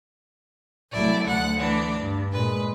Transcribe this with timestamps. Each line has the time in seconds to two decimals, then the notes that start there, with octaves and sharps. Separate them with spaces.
0.93 C2 F#3 A3 E4 D5
1.27 D2 F#5 F#6
1.59 E3 D4 D5
2.01 G2
2.32 A#2 G#3 B4